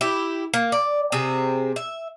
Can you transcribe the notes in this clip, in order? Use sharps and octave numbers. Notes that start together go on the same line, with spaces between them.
E4 G4
A#3
D5
C3 C4 G#4
E5